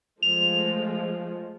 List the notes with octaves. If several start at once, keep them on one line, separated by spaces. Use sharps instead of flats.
F3 G#3 A3 F7